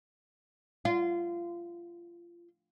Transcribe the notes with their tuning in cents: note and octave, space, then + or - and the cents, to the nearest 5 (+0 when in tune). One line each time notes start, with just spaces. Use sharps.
F4 -25